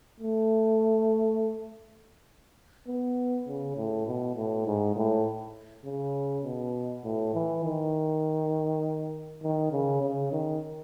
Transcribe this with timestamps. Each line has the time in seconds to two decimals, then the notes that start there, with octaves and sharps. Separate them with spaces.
0.20 A3
2.88 B3
3.48 C#3
3.77 A2
4.07 B2
4.36 A2
4.66 G#2
4.96 A2
5.85 C#3
6.44 B2
7.04 A2
7.34 E3
7.64 D#3
9.43 D#3
9.72 C#3
10.02 C#3
10.32 D#3